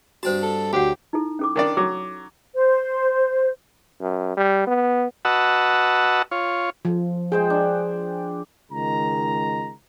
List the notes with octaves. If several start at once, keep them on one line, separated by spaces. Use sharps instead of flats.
G2 C4 F#4 C5 A5
A4
D2 F#4 G4 C#5 F#5
D#4 E4 A4
C#4 A4 D6
D#3 D4 D5
F#3 A4 D6
C5
F#2
G3
B3
F#4 B4 D#5 F#5 A5 E6
F4 C#5
F3
G#3 G#4 C5 G5
D4
C#2 D#3 G#3 A#5